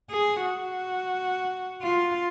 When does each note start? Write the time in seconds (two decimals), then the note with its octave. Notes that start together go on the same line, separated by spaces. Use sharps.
0.11 G#4
0.44 F#4
1.83 F4